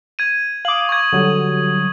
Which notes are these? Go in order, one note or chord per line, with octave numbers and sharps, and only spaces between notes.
G#6 D#7
F5 D6 D#6 F#7
C#6 G#6
D3 F#3 G3